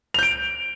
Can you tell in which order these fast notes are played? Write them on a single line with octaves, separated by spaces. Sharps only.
F7 G6 D7